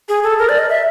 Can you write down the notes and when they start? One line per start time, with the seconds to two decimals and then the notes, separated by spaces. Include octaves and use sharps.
0.09 G#4
0.24 A4
0.39 A#4
0.49 D5
0.59 D#5
0.69 E5